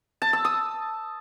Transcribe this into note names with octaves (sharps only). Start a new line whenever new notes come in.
A5
E6
D#6